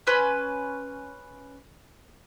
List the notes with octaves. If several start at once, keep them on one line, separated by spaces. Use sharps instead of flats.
C#4 B4 C6